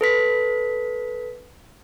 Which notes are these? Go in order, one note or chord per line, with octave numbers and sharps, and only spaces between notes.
A4 B4 B6